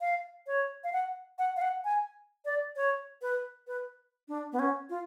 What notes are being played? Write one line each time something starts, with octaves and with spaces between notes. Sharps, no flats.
F5
C#5
F5
F#5
F#5
F5
F#5
G#5
D5
C#5
B4
B4
D4
B3
C#4
F4